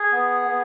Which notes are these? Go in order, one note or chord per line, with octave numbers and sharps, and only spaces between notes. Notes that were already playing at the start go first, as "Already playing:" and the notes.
Already playing: G#4
B3
B3